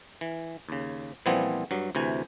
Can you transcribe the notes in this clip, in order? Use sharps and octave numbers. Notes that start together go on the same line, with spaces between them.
E3
D#2 C#3
A#2 E3 F3 G3 B3 C4
G2 F#3
D2 C3 E3 G#5